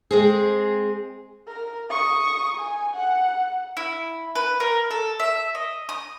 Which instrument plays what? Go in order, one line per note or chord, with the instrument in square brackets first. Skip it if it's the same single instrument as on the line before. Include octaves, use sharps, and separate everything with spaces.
[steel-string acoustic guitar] G#3 C4 G#4
[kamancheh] A#4
C#6 D#6
G#5
F#5
[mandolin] E4
B4
A#4
A4
E5
D#5
D#6